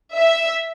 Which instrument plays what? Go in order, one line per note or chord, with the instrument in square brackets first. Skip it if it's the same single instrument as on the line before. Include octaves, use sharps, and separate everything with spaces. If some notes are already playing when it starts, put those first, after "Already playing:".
[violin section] E5